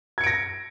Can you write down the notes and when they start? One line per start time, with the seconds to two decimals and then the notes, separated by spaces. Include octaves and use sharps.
0.18 G#6
0.21 C#7
0.24 D7
0.27 A#6